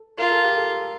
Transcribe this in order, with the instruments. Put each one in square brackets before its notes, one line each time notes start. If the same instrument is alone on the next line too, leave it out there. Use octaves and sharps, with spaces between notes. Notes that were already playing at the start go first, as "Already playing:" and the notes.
Already playing: [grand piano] A4
[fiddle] F4 [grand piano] A#4
[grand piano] A4
G4
A4